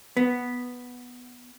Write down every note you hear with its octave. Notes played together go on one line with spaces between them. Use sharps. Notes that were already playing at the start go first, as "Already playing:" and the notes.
B3